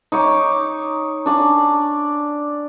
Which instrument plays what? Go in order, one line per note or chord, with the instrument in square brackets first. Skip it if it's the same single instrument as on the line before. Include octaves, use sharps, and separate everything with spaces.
[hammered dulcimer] D#4 C#5 D6
D4 D5 G#5